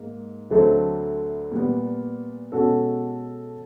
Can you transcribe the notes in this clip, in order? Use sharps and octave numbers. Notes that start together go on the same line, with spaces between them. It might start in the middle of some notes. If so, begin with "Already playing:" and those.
Already playing: G#2 A#3 D#4
D2 D3 F#3 A3 C4
A#2 G3 B3
B2 G#3 C#4 F#4 A4